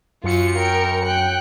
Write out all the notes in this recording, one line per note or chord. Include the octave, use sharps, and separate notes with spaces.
F#2 F4 C#7
A#4 G5
G5 F#6